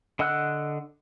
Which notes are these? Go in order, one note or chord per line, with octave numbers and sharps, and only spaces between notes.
D3 D#5 F#5 E6 F#6